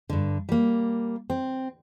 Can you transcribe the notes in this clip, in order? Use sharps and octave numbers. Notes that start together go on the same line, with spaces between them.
G2 D3
G3 A#3
C4